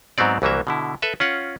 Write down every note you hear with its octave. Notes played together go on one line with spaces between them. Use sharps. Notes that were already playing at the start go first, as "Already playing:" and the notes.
G#2 F#3 B3 C4 D5
C2 E3 F#3 A#3 E5
B2 D3 E4
A4 B4 E5
C#4 F4 F#5